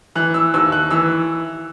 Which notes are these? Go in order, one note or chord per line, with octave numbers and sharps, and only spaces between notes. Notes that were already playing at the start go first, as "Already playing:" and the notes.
E3 F#6
E6
D#2 E6
F#6
E3 E6